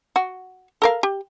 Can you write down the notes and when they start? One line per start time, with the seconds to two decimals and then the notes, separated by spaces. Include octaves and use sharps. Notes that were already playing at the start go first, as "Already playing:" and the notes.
0.16 F#4
0.82 A4 A#4 F5
1.03 G4